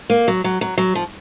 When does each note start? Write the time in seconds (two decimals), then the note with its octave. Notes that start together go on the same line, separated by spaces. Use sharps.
0.10 A#3
0.28 F#3
0.44 F#3
0.61 F#3
0.78 F#3
0.95 F3